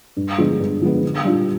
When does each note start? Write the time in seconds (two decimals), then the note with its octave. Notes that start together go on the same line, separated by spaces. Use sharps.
0.17 G2
0.38 D3 F3 G#3 B3
0.59 G2
0.81 D3 F3 G#3 B3
1.03 D3
1.24 G3 D4 F4